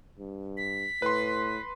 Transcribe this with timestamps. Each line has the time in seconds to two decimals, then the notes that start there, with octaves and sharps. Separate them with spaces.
0.19 G2
0.57 B6
1.02 A2 B4 C6